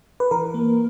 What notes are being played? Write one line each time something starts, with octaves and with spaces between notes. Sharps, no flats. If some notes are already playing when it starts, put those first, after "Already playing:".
B4
E3 A#4
A#3